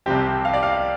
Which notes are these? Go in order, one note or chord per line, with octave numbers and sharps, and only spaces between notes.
C2 C3 F3 C4 G4
F5
D5
F5